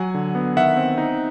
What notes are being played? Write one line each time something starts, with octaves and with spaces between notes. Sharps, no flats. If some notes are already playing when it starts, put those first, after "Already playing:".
Already playing: F#3 F#5 G#5
D3
B3
D#3 E5 F#5
C4
D#4